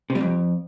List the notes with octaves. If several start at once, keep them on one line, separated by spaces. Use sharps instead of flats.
C3
G3
F2